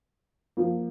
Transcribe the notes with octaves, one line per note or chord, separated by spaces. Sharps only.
F3 A#3